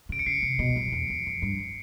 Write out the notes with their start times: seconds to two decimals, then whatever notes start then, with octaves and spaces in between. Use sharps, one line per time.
0.09 C#3 D7
0.19 C#7
0.26 C#3 C7
0.42 C3
0.59 B2
0.76 F#2
0.92 E2
1.10 F2
1.27 F2
1.42 G2